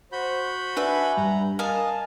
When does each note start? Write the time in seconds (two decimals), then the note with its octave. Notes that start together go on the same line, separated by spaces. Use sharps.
0.12 F#4 C5 B5 G6
0.77 D4 B4 E5 G#5
1.17 G2 A#5
1.59 A#4 D#5 F5 G#5 A5